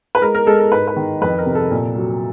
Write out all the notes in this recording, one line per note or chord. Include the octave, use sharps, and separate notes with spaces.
B4
G#3 A#4
A#4
G#3 A4
A#4
G#2 B4
B4
D#3
F2 B4
A#4
C3
A4
A#2
F#3